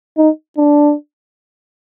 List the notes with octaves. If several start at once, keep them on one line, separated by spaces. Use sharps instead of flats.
D#4
D4